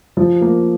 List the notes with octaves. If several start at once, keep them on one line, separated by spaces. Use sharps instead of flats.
F3
A#3